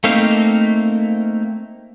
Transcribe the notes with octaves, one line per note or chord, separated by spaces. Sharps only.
A3 A#3 C4 D#4 F5